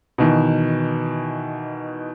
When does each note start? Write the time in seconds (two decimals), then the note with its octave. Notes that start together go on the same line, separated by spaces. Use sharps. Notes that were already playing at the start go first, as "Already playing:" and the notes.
0.18 B2 D#3 E3